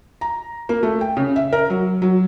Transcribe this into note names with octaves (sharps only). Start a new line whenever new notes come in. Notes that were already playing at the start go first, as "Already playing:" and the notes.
A#5
A#3
A3
G5
C#3
E5
A#4
F#3
F#3